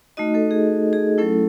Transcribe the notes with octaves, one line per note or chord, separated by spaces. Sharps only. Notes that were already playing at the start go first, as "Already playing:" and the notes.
A3 D#4 F#4 D#5
A3 A4
G#4
G#4
F#3 A3 C#4 E4 A4